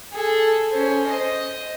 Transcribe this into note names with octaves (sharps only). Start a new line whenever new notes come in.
G#4 A4
C#4 C5
C5 D#5